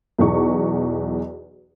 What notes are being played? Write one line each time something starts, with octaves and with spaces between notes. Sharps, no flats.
B1 E2 C#6